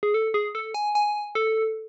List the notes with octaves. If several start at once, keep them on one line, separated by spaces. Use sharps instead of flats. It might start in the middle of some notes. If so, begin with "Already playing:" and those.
G#4
A4
G#4
A4
G#5
G#5
A4